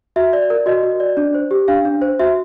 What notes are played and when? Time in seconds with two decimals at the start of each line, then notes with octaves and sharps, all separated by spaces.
0.16 F#4 E5
0.33 D5
0.50 A#4
0.66 F#4 D#5
0.83 F#4
1.00 D5
1.17 D4
1.34 C5
1.51 G4
1.68 D4 F5
1.85 D4
2.02 C5
2.20 F#4 E5